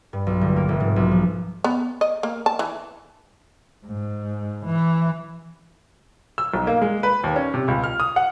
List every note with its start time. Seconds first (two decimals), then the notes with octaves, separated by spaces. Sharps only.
0.13 G2
0.27 B1
0.41 G1
0.56 A#3
0.69 F1
0.80 G#2
0.96 B1
1.11 F3
1.64 B3
2.01 D#5
2.23 A#3
2.46 A5
2.59 E3
3.86 G#2
4.65 E3
6.38 E6
6.54 B1
6.67 A#3
6.82 G#3
7.03 B4
7.24 D#2
7.36 C#4
7.54 C3
7.68 C#2
7.84 F6
8.00 D#6
8.16 F#5